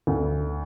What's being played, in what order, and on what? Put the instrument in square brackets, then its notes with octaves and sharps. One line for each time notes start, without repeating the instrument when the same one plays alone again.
[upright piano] D2